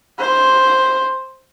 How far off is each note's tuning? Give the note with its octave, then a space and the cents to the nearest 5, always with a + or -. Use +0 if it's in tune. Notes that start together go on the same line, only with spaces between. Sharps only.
C5 +5